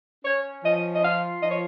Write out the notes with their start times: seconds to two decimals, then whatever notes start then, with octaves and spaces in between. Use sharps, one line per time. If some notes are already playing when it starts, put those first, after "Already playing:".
0.24 C#4 C#5
0.63 F3 D#5
0.95 D#5
1.02 F4 F5
1.43 F3 D#5
1.51 C#5